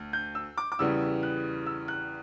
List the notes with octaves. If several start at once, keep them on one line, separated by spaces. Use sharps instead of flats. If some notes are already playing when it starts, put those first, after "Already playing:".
Already playing: D2
G6
E6
D6
D6
E2 C#3 E3 G3 B3 E6
F#6
E6
F#6